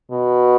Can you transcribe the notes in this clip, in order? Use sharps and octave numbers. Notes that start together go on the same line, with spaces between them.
B2